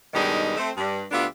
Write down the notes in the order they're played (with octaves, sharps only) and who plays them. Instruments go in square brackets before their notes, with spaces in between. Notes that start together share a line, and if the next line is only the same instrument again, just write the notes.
[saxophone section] G2 B2 D#3 G3 G#3 D#4
A3 C4
G2
D2 B3 D4 F4 G4 E5